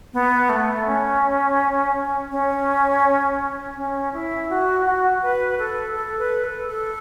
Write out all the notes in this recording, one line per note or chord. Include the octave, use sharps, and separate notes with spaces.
B3
A3
C#4
C#4
C#4
E4
F#4
F#4
B4
A4
A4
B4
A4
A4